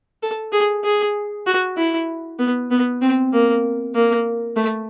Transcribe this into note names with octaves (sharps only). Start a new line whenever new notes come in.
A4
G#4
G#4
F#4
E4
B3
B3
C4
A#3
A#3
A3